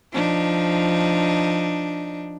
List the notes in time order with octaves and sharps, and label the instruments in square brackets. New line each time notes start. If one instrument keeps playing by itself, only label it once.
[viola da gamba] F3 D4 D#4